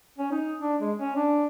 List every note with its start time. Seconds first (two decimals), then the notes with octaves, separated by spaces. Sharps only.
0.18 C#4
0.31 D#4
0.60 D4
0.81 G#3
0.97 C#4
1.16 D4